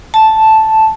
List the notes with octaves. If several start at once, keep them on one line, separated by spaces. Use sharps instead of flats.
A5